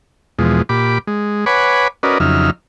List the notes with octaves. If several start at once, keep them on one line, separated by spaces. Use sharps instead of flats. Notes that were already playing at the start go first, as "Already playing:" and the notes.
E2 B2 F3 G#3
A#2 G4 B5 D6
G#3
B4 C#5 F#5 G#5 B5 D6
C#4 F#4 A#4 B4 D5 D#5
F2 C#3 F#3 D#4 E5 F6